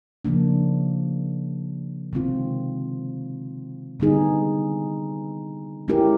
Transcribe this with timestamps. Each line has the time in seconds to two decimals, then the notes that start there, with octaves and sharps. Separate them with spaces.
0.25 C#3 F3 A#3 D4
2.13 C3 D#3 G#3 C4 F4
4.00 D3 G3 B3 D#4 G#4
5.88 G#3 C#4 E4 G4 A#4